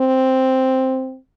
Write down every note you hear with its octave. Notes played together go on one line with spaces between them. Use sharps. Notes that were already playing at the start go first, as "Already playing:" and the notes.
Already playing: C4